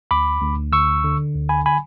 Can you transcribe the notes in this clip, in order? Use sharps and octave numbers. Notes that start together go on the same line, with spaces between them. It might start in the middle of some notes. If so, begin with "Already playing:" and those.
D2 B5 D6
D2
D3 C#6 E6
D3
D2
G#5 B5
G#5 B5